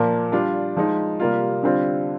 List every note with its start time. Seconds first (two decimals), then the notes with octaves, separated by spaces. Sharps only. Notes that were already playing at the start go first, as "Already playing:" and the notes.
Already playing: A#2 F3 A#3
0.32 G3 D4 F4
0.76 F3 G#3 D#4
1.20 C3 G3 A#3 F4
1.63 D3 G3 C4 F4